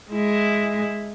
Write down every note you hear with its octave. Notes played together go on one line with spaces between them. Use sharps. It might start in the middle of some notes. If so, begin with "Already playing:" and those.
G#3 E4